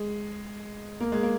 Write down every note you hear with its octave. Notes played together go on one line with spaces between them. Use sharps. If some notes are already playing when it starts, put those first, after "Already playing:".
Already playing: G#3
A#3
G#3
A#3